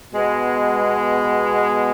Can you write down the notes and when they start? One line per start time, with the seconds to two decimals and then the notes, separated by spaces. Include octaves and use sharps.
0.11 B2 G#3 B3